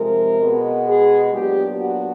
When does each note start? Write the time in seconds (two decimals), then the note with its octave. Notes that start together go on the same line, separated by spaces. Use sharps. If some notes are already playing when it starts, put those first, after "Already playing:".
Already playing: C3 F3 G#3 A#4
0.38 B2 G#3 B3
0.85 G#4
1.33 A#2 F#3 B3 D4 G4
1.80 F#4